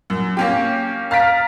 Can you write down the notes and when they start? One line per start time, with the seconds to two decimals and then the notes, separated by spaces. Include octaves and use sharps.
0.10 F#2
0.37 A#3 C#4 G4
1.11 F5 A#5 F6 A6 B6 D7